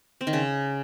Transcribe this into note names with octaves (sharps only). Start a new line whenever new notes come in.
C4
D#3
C#3